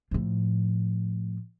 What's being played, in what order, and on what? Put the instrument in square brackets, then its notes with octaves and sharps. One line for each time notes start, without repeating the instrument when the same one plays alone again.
[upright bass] A2 F3